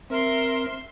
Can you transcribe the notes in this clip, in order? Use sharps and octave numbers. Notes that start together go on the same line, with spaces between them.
C4 A#4 E5 C6